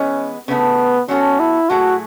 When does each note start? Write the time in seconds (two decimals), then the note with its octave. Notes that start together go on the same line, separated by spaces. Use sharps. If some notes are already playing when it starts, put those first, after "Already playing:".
Already playing: E3 G#3 B3 C#4
0.48 C#3 E3 A3 B3
1.08 F#3 B3 C#4 F#4 A4
1.40 E4
1.69 A2 F#3 A3 E4 F#4 G#4